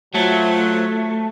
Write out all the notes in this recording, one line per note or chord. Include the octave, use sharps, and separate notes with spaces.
F#3 A3 F4 F#4 C5